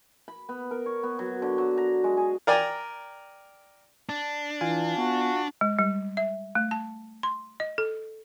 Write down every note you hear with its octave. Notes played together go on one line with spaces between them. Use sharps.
B5
B3
A#4
C#5
B3
F#3
D3
F#3
A#5
G#3
G#4
A#4 D5 G5 G#5 A#5
D4
E3 F4 F5 G#5
B3 F#4
G#3
G3
E5
A3
A5
C6
D#5
A4